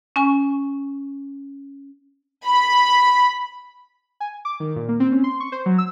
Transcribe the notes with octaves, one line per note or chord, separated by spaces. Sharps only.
C#4 G#5 C#6
B5
G#5
D6
D#3
A#2
A#3
C4
C#4
C6
C#6
C5
F#3
E6